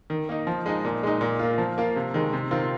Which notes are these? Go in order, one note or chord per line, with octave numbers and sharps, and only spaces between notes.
D#3
A#3 D#4
F3
G#3 D#4
A#2
G#3 D#4
A#2
A#3 F4
F3
A#3 F4
C3
D#3 G#3
C3
D#3 C4 F4